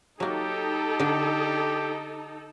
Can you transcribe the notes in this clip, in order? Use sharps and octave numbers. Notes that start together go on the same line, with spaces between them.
F#3 A#3 D#4 G4 A4
D3 D4